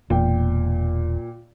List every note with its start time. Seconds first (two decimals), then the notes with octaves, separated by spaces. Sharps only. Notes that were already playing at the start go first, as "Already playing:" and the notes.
0.10 E1 A#2 G5